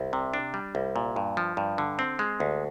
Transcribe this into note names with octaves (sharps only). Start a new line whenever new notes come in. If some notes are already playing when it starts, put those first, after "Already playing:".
Already playing: C2
C3
D4
G3
C2
A#2
G2
F3
G2
D3
C4
G#3
D2